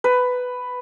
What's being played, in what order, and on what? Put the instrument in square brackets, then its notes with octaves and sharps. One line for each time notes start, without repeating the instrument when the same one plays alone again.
[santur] B4